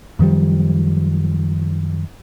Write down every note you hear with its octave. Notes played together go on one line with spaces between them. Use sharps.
F#2 D#3 F3 G3